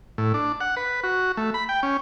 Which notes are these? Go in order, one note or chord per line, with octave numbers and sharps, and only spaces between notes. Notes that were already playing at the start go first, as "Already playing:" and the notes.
A2
D4
F#5
B4
F#4
A3
B5
G5
C#4